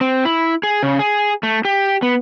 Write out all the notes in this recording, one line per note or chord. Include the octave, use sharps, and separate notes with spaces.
C4
E4
G#4
C#3
G#4
A3
G4
B3